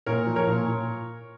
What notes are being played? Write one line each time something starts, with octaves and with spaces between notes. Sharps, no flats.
A#2 A#4 C#5
F3
A#4 C#5
A#2
A#2